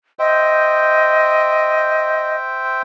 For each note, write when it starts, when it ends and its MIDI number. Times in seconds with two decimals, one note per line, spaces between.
0.19 2.82 72
0.19 2.35 75
0.19 2.82 76
0.19 2.82 79